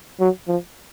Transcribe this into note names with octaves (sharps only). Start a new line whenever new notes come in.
F#3
F3